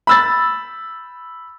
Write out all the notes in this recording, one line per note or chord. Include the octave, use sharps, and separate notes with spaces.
B5 E6 A6